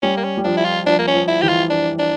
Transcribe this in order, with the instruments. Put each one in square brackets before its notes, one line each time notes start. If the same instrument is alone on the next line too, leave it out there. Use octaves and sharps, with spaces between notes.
[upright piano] G3 [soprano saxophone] C#4
[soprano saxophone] A#3
C#4
[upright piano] G3
[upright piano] F3 [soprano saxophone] D4
[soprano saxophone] E4
F4
[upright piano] F3 [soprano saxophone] D4
[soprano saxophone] A#3
C#4
[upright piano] F3
[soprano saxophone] E4
[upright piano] E3 [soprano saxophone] G4
[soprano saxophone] F4
D4
D4